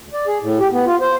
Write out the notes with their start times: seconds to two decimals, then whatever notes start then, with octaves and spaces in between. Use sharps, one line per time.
0.02 D2
0.13 D5
0.27 G#4
0.42 A2
0.59 G4
0.72 B3
0.86 F4
1.01 C5